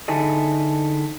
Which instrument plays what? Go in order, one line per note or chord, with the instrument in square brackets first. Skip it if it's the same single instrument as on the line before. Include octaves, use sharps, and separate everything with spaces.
[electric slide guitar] D3 D#4 E4 G#4 A4 D#5